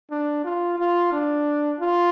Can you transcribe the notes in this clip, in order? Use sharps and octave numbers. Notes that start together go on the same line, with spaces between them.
D4
F4
F4
D4
F4